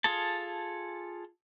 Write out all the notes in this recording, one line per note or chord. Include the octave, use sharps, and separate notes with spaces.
F4 G#4 A4 A5